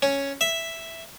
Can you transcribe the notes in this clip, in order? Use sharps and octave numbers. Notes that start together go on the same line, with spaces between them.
C#4
E5